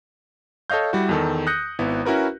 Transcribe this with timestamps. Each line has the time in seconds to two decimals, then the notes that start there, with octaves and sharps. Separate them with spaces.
0.70 A4 C#5 D#5 F5 G6
0.93 G3 E4 F#4
1.09 E2 D#3 A4
1.47 D#6 F#6 G6 A#6 C#7
1.79 G#1 B3 E4
2.05 C#4 E4 F#4 A#4 B4